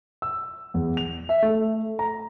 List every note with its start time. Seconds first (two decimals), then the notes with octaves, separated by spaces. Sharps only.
0.22 E6
0.74 E2
0.97 F7
1.29 E5
1.42 A3
1.99 A#5